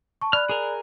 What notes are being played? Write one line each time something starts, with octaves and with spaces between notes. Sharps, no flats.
A5 C#6
D5 B5 F6 F#6
G#4 A#4